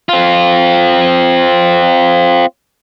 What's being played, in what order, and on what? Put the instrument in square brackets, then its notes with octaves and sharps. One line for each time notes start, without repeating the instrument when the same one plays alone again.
[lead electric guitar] C4 F4